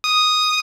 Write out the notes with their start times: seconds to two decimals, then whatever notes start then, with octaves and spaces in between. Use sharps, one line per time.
0.04 D#6